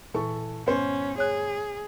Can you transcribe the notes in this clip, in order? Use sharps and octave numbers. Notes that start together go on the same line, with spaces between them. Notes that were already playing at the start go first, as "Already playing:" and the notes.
A#2 E3 A4 C#6
G1 C#4 C5
G#4 C#5 F#6